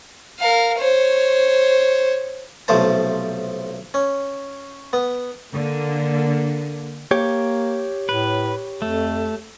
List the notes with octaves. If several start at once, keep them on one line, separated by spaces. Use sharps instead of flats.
A#4 F5
C5 C#5
B1 C3 F3 A3 C5 A5
C#4
B3
D3 A#3
A#3 G4 C#5
A2 B4
F2 A3